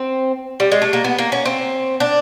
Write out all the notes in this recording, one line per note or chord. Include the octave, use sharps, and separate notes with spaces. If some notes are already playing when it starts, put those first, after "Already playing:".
Already playing: C4
G3
G#3
A3
A#3
B3
A#3
C#4
C4
D4